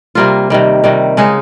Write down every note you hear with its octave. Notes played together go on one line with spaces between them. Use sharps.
C3 G3 A#3 F4
C3 D#3 G3
C3 D#3 G3
C#3 G#3 D#4